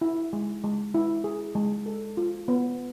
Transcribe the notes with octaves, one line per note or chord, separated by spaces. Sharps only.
E4
G#3
G#3
E4
G#4
G#3
A4
F4
B3